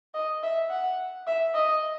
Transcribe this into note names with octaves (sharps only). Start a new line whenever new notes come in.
D#5
E5
F#5
E5
D#5